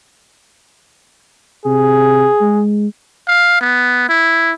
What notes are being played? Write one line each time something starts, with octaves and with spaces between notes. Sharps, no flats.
C3 G#4
G#3
F5
B3
E4